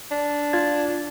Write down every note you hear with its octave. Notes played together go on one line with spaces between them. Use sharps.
D4
F4 G#6 A6